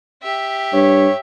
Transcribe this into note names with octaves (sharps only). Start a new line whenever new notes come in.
G4 E5
G2 C#5